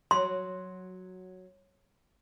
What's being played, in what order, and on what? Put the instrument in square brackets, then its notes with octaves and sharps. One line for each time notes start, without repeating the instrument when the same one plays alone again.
[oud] F#3 [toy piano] C6